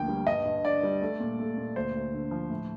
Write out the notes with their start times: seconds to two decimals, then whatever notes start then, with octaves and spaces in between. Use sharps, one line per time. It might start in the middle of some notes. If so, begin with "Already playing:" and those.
Already playing: D2 D3 F3 A#3 G5
0.08 G3
0.26 G2 D#5
0.45 G2
0.63 D3 D5
0.83 G3
1.01 A3
1.20 A#2
1.39 A3
1.58 A#2
1.76 D2 C5
1.95 D2
2.13 D3
2.31 F3
2.50 A2